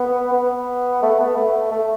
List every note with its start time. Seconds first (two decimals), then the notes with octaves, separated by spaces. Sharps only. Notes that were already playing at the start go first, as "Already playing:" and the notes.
Already playing: B3
0.32 B3
1.02 A3
1.20 B3
1.37 A3
1.71 A3